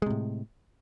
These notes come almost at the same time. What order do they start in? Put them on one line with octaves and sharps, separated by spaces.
G#3 C3 A2